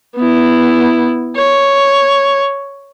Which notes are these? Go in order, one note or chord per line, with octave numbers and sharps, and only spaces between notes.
B3 E4
C#5